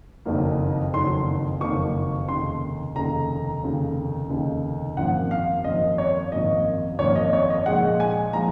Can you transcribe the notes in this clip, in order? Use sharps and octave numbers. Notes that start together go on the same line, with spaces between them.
F#1 F2 D#3 F#3 A#3
F#1 F2 D#3 F#3 A#3 C6
F#1 F2 D#3 F#3 A#3 C#6
F1 D#2 C#3 C6
F1 D#2 C#3 A#5
F1 D#2 C#3
F1 D#2 C#3
G#1 F#2 F3 A#3 F#5
F5
G#1 F#2 F3 A#3 D#5
C#5
G#1 F#2 F3 A#3 D#5
G#1 F#2 F3 A#3 C#5
D#5
C#5
D#5
A#1 A#2 F3 G#3 F#5
G#5
A#2 F3 G#3 A#5